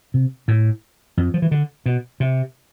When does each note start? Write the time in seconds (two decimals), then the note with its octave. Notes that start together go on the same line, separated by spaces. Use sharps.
0.14 C3
0.48 A2
1.17 F2
1.34 F3
1.42 E3
1.51 D3
1.86 B2
2.20 C3